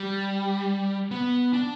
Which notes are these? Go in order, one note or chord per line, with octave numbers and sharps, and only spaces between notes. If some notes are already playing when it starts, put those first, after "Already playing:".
Already playing: G3
B3
D4